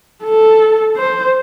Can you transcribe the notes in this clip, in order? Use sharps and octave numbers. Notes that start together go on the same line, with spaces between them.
A4
C5